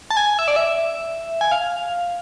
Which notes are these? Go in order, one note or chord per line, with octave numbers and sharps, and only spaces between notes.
A5
G#5
E5
D5
E5
G#5
F5